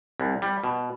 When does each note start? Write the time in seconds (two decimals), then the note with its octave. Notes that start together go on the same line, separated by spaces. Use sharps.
0.20 C2
0.42 G3
0.64 B2